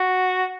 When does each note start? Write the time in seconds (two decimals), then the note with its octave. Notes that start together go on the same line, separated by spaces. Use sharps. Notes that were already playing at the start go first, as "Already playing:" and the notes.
Already playing: F#4